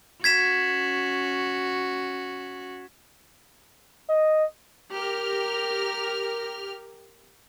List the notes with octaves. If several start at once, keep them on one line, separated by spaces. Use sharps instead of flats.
C#4 F#4 G#6 B6 E7
D#5
G4 A#4 F6